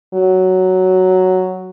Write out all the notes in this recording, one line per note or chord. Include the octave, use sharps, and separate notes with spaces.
F#3